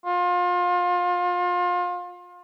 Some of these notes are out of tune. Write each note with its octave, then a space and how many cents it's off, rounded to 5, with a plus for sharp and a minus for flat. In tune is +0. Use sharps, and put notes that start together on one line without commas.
F4 +30